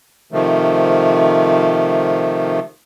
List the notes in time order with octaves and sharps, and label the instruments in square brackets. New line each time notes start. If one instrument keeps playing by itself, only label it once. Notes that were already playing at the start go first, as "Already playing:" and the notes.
[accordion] C3 D#3 F3 A3